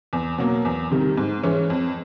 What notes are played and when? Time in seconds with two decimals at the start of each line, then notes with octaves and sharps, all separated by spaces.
0.13 E2
0.38 B2 F#3 A#3
0.65 E2
0.91 C3 D#3 G3
1.17 G#2
1.43 E3 G#3 C#4
1.70 F2